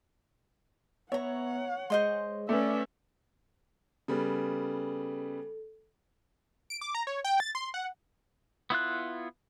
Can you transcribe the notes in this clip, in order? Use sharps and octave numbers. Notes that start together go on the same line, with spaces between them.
B3 C#5 E5 F#5 A#5
G#3 C5 D#5 C6
A3 C#4 B4 D5 E5
C#3 G3 B3 A4
D7
D6
A#5
C#5
G5
A6
C6
F#5
B3 E4 F4 F#6